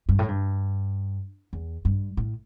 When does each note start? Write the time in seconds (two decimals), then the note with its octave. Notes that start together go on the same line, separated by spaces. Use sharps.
0.09 G2
0.19 A2
0.28 G2
1.53 E2
1.85 G2
2.17 A2